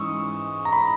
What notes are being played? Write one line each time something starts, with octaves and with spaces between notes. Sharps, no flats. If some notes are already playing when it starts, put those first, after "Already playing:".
Already playing: G#2 E3 G#3 C#4 C#6 D#6 E6
A#5
B5